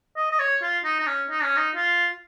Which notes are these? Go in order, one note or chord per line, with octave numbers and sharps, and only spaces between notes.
D#5
D#5
C#5
F4
D#4
D#4
C#4
D#4
C#4
D#4
F4